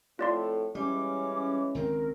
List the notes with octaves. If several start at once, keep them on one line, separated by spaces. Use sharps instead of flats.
F2 A2 A3 F4 D5 C6
E3 G3 G#3 C#4 D6
C#2 D#3 C4 A#4